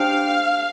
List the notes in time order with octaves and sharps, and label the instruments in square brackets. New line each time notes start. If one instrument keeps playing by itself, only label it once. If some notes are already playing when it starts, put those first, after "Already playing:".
Already playing: [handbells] D4 G4 C5 G5 [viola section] F5